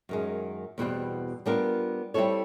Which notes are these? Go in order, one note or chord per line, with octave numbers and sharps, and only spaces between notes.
F#2 D#3 G#3
E2 B2 G3 C4
G3 B3 D4 F4 A#4
G3 C4 E4 A4 C#5